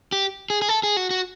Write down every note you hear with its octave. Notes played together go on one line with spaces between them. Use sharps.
G4
G#4
G#4
A4
G#4
F#4
F#4